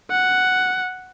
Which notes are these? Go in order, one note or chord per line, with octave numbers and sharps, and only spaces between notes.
F#5